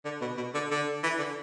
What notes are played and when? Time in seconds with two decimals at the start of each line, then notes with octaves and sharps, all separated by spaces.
0.05 D3
0.21 B2
0.37 B2
0.54 D3
0.71 D3
1.03 E3
1.19 D3